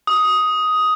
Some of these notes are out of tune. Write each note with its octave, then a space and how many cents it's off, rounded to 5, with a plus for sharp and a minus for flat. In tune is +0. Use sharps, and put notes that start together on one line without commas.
D#6 +10